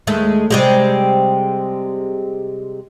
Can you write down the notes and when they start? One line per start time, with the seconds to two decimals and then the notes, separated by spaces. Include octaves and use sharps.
0.07 D#2 G#3 A3
0.50 C3 G3 G#3